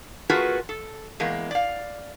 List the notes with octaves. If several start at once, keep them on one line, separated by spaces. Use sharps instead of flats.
A3 F4 F#4 G#4 A#4 B4
A4
E2 G#3 A#3
D5 F5